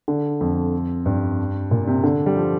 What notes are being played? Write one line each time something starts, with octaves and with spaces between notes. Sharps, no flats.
D3
F2
G2
A#2
C3
D3
G3
F3